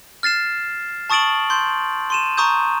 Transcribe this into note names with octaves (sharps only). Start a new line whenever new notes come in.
F6 A6 C7 E7
A5 C#6 D#6 A6 D7 F#7
C6 G6
C6 D#7 E7
A#5 C#6 D#6 G6